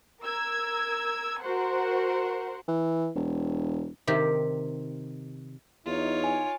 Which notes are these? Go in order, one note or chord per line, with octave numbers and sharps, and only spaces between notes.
A#4 E6 G#6
F#4 A#4 C5 F#5
E3
E1
C3 D#3 G4
E2 D#4 F4 C#5
G#5